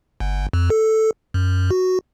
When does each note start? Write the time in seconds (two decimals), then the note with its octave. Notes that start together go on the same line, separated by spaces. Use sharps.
0.20 G1
0.53 F2
0.70 A4
1.34 F#2
1.71 F#4